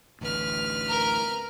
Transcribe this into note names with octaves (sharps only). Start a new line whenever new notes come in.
A1 D2 B4 F6
A#4